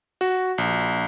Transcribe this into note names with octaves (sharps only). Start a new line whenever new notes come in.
F#4
A#1